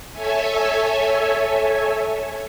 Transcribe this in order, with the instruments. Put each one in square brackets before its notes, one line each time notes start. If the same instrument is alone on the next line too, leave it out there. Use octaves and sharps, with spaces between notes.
[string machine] A4 C#5 E5 G#5